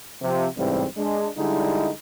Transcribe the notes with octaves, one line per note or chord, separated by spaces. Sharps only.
C3 F3
A1 G#2 C3 E3 G3 C4
G#3 D4
D3 G3 G#3 D#4 E4